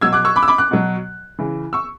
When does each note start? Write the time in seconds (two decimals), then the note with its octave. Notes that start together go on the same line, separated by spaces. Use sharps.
0.01 B2 F#3 E6 G#6
0.13 D6 F#6
0.25 C#6 E6
0.36 B5 D6
0.43 E6
0.48 B5 D6
0.58 D6 F#6
0.71 B2 F#3
1.39 C#3 E3
1.73 C#6 E6